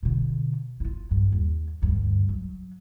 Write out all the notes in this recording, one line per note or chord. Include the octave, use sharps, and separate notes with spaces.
B2 D3
E4 F4
G2
D#2
D2 G2
F#3